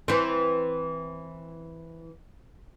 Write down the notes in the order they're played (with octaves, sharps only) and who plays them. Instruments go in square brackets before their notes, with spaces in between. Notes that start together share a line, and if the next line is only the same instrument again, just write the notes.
[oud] E3 C4